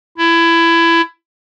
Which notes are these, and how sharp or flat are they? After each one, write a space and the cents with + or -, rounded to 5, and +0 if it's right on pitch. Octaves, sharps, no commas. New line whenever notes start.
E4 +20